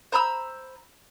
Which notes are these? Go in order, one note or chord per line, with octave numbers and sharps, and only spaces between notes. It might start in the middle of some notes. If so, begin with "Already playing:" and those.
C5 A#5 B5 E6